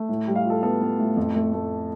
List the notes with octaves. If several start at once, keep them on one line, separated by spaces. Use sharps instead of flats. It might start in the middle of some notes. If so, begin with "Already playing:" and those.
Already playing: A3
A2
G3
F5
F4 A4
B3 A4
B3
A2
F2
A3
A3